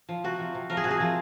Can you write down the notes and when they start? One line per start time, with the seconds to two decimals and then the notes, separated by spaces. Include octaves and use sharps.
0.09 F3
0.24 C3 F#4
0.39 F3
0.55 C3
0.70 F3 A#4
0.77 G#4
0.84 C3 F#4
0.91 G#4
1.00 F3